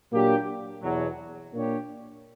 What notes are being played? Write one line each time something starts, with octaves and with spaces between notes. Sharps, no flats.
A#2 F#3 A#3 D4 G4
E2 B2 F#3
A#2 A#3 D4 G4 C#5